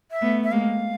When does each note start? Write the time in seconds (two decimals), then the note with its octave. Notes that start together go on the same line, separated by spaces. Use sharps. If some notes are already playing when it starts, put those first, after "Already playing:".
0.12 E5
0.22 A3 B3
0.44 E5
0.52 G#3 A#3 F5